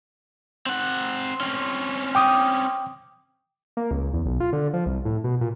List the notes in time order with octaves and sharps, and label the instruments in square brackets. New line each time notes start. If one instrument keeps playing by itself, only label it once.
[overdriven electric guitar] C4 F#5
C4 C#4
[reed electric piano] G5 D6 D#6
[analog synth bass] A#3
C#2
E2
B1
F4
D3
F3
C2
A2
B2
A#2